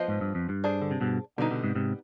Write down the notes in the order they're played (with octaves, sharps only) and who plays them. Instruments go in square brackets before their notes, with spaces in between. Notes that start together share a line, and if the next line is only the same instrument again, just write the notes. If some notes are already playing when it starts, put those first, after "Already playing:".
Already playing: [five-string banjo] F3 B3 F4 C5 D#5
[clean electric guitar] G#2
G2
F2
G2
[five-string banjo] D4 G#4 C5
[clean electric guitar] D3
C3
G2 B2
[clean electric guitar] B2 D3 [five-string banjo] G3 B3 D#4
[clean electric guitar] B2 D3
G#2 C3
G#2 C3